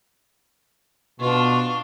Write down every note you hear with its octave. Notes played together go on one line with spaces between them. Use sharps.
B2 D4 F4 C#6